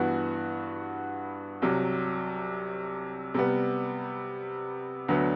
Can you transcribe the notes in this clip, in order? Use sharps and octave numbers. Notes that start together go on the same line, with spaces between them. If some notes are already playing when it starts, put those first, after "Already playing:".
Already playing: G2 E3 B3 F#4
C2 C3 F#3
C3 G3 B3
D2 D3 F#3 B3